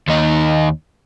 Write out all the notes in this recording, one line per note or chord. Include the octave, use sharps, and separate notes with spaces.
D#2 D#4